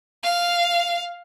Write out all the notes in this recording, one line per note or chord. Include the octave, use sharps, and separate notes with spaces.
F5